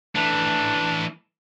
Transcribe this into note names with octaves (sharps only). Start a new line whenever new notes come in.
E3 A3 D4